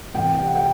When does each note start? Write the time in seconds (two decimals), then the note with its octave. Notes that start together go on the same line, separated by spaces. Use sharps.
0.14 C2 C3 E3 G5
0.35 G5
0.46 F#5
0.55 G5